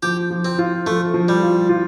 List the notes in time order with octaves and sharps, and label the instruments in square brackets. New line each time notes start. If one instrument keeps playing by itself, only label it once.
[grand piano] F3 [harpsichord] G4
[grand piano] F3
[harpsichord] C4
[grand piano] F4
[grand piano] F3 [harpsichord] A3
[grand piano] F3
[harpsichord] G3
[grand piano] F4
F4